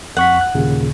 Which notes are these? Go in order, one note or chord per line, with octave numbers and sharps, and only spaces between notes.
F2 F#5 C#6 B6
F#6
D#2 A#2 C#3